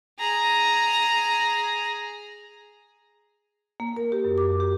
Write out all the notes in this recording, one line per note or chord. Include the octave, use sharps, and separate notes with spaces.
G#4 A#5
A#3
A#4
G4
F#2
D6
G4